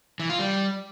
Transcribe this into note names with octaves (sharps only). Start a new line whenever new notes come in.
E3
F4
G3